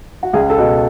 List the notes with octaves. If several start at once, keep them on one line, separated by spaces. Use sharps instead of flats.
F#4
C#2 G#4
A4
B2